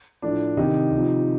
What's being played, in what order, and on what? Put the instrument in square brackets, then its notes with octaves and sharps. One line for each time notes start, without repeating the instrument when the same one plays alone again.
[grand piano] A2 F3 D4
C3 D#3 D#4 G4
C3 F3